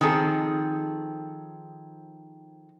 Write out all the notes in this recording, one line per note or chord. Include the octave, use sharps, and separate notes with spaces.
D#3 F3 C4 G#4 A4